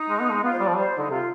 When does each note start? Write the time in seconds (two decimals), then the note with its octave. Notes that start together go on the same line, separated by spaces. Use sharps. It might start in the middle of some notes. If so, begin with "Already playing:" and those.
Already playing: D#4
0.09 G#3
0.21 B3
0.32 G#3
0.43 B3 F4
0.51 C5
0.60 G3 D5
0.68 F3
0.76 G3 C5
0.93 D#4
0.98 D3
1.10 C3 F4